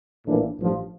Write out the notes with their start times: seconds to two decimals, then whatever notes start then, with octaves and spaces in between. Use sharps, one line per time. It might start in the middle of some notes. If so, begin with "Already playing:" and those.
0.25 A#1 A2 E3 A#3 D4
0.58 A1 G2 F3